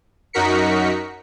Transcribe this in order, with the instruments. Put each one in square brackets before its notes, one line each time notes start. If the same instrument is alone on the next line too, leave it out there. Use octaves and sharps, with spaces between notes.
[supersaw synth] F#2 D#4 F#4 A#4 B6 C#7